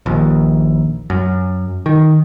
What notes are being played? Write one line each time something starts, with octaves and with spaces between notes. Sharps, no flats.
A#1 D#2
F#2
D#3